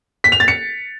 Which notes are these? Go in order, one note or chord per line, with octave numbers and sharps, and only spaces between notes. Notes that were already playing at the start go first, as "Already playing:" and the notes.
B6
F7
A6
C#7